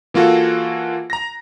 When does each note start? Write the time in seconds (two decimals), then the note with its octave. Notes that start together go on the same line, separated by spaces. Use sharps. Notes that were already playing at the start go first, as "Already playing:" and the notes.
0.14 E3 A#3 F4 F#4 A4
1.10 A#5 A#6